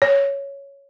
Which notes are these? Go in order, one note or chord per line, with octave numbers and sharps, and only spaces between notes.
C#5